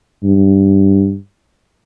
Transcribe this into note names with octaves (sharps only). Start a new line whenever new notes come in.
G2